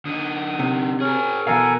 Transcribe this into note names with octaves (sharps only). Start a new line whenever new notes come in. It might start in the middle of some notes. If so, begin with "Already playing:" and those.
D3 D#4 D#6
C3
C#4 G#4 A#4
B2 E3 A4 A#4 F5 G#5